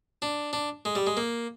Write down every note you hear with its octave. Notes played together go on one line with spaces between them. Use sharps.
D4
D4
G#3
G3
G#3
A#3